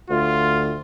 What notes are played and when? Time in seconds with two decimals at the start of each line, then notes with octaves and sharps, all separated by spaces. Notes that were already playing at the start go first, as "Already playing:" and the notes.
0.10 D2 F4